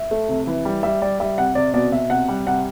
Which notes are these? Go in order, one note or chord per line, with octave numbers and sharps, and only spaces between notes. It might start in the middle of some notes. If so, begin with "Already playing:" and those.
Already playing: E5
A3
C3
E3
G3
G3 E5
G3 D5
G3 E5
C3 F#5
C3 D5
B2 D5
B2 E5
C3 F#5
G3
C3 F#5